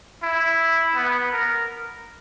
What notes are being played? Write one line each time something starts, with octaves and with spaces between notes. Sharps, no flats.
E4
B3
A#4